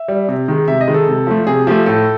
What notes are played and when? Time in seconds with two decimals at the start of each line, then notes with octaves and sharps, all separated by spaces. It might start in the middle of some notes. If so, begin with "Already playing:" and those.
Already playing: E5
0.08 G3
0.29 C3
0.48 D#3 G#3
0.68 C3 E5
0.81 D#5
0.88 D#3 G#3
0.94 A4
1.08 C3
1.27 F3 A3
1.47 C3 G#4
1.67 F3 A3 G4
1.86 A2 A4